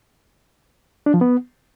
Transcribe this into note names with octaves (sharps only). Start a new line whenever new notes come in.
D4
F3
B3